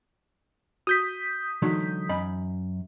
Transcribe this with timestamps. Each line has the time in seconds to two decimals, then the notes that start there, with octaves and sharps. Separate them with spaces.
0.87 F#4 D#6 G6 B6
1.62 D3 E3 F#3 G#3 D#4 F#4
2.09 F#2 D#5 B5